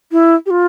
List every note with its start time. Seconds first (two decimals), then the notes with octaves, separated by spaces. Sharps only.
0.12 E4
0.46 G4
0.50 F4